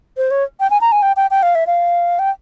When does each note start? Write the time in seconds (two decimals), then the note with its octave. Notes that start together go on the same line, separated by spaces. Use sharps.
0.17 C5
0.31 C#5
0.60 G5
0.70 G#5
0.81 A#5
0.92 G#5
1.02 G5
1.17 G5
1.31 G5
1.43 F5
1.55 E5
1.67 F5
2.19 G5